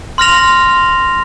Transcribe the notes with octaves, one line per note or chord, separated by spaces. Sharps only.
C6 F6 A#6 F7